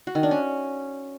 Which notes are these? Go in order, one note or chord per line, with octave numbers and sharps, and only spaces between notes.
F#4
D#3
D4
C#4